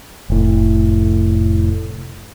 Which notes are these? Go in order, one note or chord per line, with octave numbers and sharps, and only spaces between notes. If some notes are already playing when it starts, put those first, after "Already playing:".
F1 A2